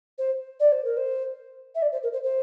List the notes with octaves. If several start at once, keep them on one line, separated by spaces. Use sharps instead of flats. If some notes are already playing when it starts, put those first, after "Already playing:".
C5
D5
C5
A#4
C5
E5
D5
C5
A#4
C5
C5